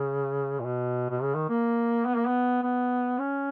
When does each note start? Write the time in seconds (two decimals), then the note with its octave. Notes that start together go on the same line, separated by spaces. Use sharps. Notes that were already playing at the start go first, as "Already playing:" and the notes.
Already playing: C#3
0.60 A#2
0.65 B2
1.10 B2
1.22 C#3
1.35 D#3
1.49 A#3
2.06 B3
2.16 A#3
2.27 B3
2.63 B3
3.19 C#4